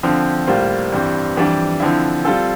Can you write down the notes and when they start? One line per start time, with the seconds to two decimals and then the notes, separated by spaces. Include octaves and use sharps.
0.03 D3 F3 C4
0.47 A2 G3 A#3 F4 C5
0.92 G2 E3 G3 C4
1.36 F2 E3 G3 D4 G4
1.80 D3 F3 C4 E4
2.25 G3 C4 F4 A4